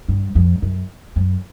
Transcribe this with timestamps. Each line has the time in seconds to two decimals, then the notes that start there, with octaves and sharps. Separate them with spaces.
0.09 G2
0.35 F2
0.62 F#2
1.16 F#2